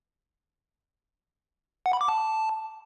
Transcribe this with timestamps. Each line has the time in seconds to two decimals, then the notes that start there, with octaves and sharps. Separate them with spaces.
1.86 F#5
1.93 B5
2.01 D6
2.08 A5